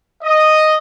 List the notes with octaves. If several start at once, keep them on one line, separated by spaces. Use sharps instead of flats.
D#5